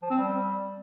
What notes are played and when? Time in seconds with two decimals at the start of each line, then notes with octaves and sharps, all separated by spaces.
0.02 F3
0.10 C4
0.18 G3